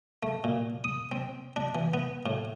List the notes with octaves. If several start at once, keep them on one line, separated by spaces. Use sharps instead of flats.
A3
A#2
D#6
C4
D4
E3
B3
A2